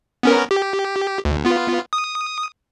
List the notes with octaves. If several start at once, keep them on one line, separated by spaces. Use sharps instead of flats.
B3 C#4 A#4
G4
D2
B3 F4
D#6